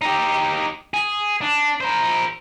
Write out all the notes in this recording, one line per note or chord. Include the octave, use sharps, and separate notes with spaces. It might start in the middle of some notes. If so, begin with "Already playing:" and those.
D#4 G4
G#4
D4
A#4 C5